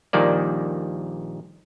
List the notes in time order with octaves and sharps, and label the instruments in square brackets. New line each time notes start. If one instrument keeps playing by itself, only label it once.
[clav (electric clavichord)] A#1 A#2 D#3 G3 A#3 D5